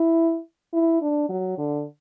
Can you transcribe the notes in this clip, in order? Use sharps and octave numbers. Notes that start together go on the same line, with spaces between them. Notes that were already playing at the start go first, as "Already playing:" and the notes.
Already playing: E4
E4
D4
F#3
D3